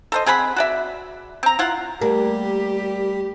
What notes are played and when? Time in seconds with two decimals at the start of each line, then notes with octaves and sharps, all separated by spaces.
0.12 A4 C5 D#5
0.26 C4 G#4 F#5 B5
0.56 F#4 D5 E5
1.43 C4 A#5
1.59 E4 F4 F#5
2.02 G3 A3 A#3 G4